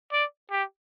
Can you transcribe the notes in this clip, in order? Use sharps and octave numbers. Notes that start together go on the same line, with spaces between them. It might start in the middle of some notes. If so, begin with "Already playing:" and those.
D5
G4